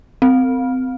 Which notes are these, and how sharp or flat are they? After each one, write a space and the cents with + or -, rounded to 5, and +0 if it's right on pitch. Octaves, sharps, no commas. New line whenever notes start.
C4 -25